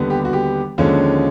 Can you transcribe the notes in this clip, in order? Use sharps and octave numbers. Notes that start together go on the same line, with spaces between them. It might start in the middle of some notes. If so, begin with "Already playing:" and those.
Already playing: D#2 D3 G3 B3
G4
F#4
G4
D#2 D3 F3 G#3 C#4